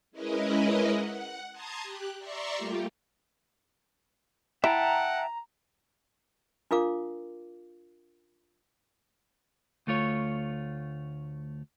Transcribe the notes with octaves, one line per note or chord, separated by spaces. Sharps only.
G#3 C#4 E4 A#4 B4 D#5
F#5
A5 A#5 C6 D#6 G#6
G4 F#6
D5 E5 A#5 C6 C#6
G3 A3 A#3 F4 G4
E4 E5 F#5 G5 A5 A#5
D4 F4 A#4 F5 D6
D2 A3 F4 C#5